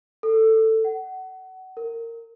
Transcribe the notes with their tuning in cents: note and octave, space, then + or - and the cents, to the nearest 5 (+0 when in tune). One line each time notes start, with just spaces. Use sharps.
A4 +10
F#5 +25
A#4 -20